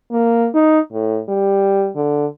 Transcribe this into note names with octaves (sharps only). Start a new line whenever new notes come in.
A#3
D#4
A2
G3
D3